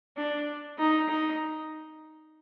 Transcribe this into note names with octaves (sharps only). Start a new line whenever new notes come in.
D4
D#4
D#4